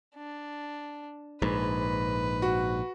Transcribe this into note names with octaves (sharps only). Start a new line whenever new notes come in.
D4
A#1 G#2 B4
F#4